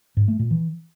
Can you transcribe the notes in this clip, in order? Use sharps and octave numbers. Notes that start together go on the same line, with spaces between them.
G#2
A3
A#2
E3